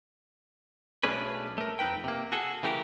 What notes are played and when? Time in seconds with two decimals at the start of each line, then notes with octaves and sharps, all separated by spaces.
1.03 B1 A3 C#4 D4 G#4 B4
1.58 A3 A#4
1.79 F2 C4 D#4 B4 G5
2.04 C3 A#3
2.32 F#4 G#4 A4
2.63 C#3 E3 A3 G4 G#4 A#4